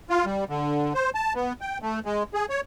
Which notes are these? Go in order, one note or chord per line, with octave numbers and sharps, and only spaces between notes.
F4
G3
D3
C5
A5
B3
G5
A3
G#3
G#4
C#5